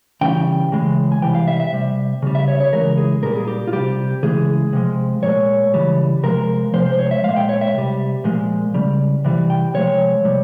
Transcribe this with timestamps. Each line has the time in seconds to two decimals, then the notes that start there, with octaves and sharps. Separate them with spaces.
0.21 C#3 E3 G3 G5
0.72 C#3 E3 G#3
1.12 G#5
1.22 C3 E3 G3 G5
1.35 F5
1.47 E5
1.60 E5
1.73 C3 G3
2.22 C#3 G3
2.35 E5
2.48 C#5
2.60 C#5
2.73 C#3 E3 G#3 A#4
2.97 G#4
3.23 A#2 G3 A#4
3.36 G#4
3.47 G4
3.68 F4
3.73 C3 G3 G4
4.23 C#3 E3 G#3 G#4
4.73 C3 F3 G#3
5.23 A#2 G#3 C#5
5.74 C#3 E3 G3
6.23 C3 F3 G#3 A#4
6.74 C3 F3 G#3 C5
6.86 C5
6.99 C#5
7.11 E5
7.24 G#3 F5
7.28 A#2
7.36 G5
7.49 C#5
7.61 E5
7.74 C3 G3
8.24 A#2 F3 G#3
8.74 C#3 G3
9.25 C3 E3 G3
9.50 G5
9.74 C3 F3 G#3 C#5
10.25 C3 G3